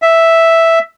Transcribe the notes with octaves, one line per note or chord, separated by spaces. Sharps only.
E5